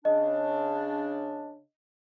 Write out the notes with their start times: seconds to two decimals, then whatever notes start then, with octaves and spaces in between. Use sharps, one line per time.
0.05 C#3 D4 D#5